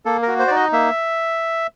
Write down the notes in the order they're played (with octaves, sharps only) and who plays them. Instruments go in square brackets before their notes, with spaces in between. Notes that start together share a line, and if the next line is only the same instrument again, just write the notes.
[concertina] A#3 A4
F#4 A#4
C5
D5
D#4
D#5
A#3 E5